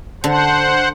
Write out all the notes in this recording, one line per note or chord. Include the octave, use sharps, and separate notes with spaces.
D3 C5 F#5